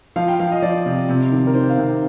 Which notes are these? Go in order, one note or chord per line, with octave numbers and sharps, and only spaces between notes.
F3 F5
G5
F3 F5
D#5
F3 D5
C3
C3
D#3
A#4
D#3 C5
F5
C3